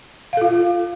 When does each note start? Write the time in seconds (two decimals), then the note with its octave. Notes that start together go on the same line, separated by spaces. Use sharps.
0.33 F5
0.37 A4
0.41 F4